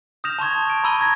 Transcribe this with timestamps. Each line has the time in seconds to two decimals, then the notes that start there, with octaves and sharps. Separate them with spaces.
0.24 D#6 F6 G6 A#6 E7 F7
0.39 A5 C6 C#6 G#6
0.56 A5
0.70 D7
0.84 A#5 B5 E6 D#7 G7
0.99 C#6 G#6 A#6